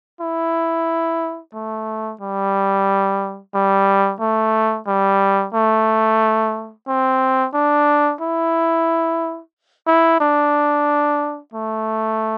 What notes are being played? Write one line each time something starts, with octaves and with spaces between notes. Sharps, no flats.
E4
A3
G3
G3
A3
G3
A3
C4
D4
E4
E4
D4
A3